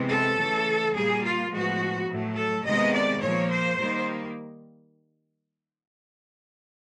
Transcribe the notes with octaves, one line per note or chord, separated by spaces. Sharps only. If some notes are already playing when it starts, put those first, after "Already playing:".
Already playing: C3 E3 G#3 B3
A4
C#3 E3 A3
A#2 G3 A#3 G#4
F4
A2 F3 G#3 B3 F#4
A2 F#3 A3
A4
C3 D#3 G#3 B3 D#5
D5
A#2 F3 A#3 C#5
C5
D#3 G3 A#3